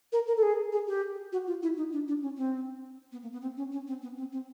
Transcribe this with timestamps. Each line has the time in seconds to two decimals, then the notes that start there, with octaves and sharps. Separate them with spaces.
0.12 A#4
0.27 A#4
0.37 A4
0.42 G#4
0.72 G#4
0.87 G4
1.32 F#4
1.47 F4
1.62 E4
1.77 D#4
1.92 D4
2.08 D4
2.22 C#4
2.37 C4
3.12 B3
3.22 A#3
3.32 B3
3.41 C4
3.57 C#4
3.72 C#4
3.87 C4
4.02 B3
4.17 C4
4.32 C4